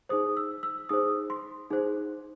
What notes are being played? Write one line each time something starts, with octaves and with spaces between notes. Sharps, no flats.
D#4 G#4 C5 D#6
E6
E6
D#4 G#4 C5 D#6
C6
D#4 G#4 C5